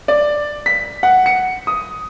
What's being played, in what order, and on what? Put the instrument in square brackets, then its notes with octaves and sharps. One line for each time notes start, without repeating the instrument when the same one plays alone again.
[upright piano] D5
B6
F#5
C#7
D#6